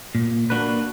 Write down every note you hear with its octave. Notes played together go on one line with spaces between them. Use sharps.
A#2
A#3 D4 F#4 B4